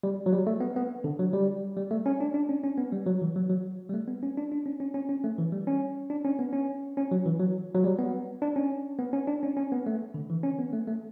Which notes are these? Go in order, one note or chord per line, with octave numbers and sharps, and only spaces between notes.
G3
F#3
G3
A3
B3
B3
D3
F#3
G3
G3
A3
C#4
D4
D4
C#4
C#4
B3
G3
F#3
E3
F#3
F#3
G3
A3
B3
C#4
D4
D4
C#4
C#4
C#4
C#4
A3
E3
G3
C#4
D4
C#4
B3
C#4
C#4
F#3
E3
F#3
F#3
G3
B3
D4
C#4
B3
C#4
D4
C#4
C#4
B3
A3
D3
E3
C#4
B3
A3
A3